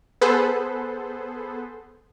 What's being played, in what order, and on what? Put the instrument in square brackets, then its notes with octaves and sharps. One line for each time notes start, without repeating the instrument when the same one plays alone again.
[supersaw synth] B3 G#4 A4 B4 C5